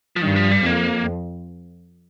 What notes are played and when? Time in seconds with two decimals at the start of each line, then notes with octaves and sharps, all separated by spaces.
0.16 F3
0.21 G2 D#3
0.36 F3
0.51 G3
0.65 F2 A#3